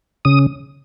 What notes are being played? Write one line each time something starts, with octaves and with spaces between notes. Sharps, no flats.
C#3 D#6